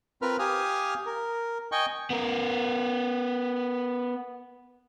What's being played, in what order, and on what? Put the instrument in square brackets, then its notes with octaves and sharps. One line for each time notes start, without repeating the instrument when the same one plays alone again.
[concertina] C4 F4 A#4 B4 B5 F6
G4 F5 G#5 D#6 F6
A#4
D#5 G5 G#5 C#6
[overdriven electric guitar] B3 A#4